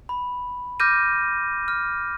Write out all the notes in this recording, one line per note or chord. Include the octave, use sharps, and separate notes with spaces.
B5
D6 F6 G6 A#6 D#7
F6